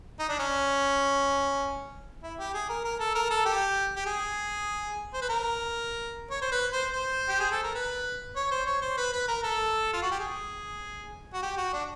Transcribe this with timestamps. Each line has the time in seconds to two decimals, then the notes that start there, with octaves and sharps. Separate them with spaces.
0.19 D#4
0.29 D4
0.39 C#4
2.23 E4
2.39 G4
2.54 G#4
2.69 A#4
2.84 A#4
3.00 A4
3.15 A#4
3.30 A4
3.45 G4
3.96 G4
4.06 G#4
5.13 C5
5.21 B4
5.29 A#4
6.31 C#5
6.41 C5
6.52 B4
6.73 C5
6.93 C5
7.29 G4
7.40 G#4
7.52 A4
7.63 A#4
7.74 B4
8.36 C#5
8.51 C5
8.66 C#5
8.81 C5
8.97 B4
9.12 B4
9.28 A#4
9.43 A4
9.93 F4
10.02 F#4
10.11 G4
10.19 G#4
11.33 F#4
11.42 G4
11.57 F#4
11.73 D4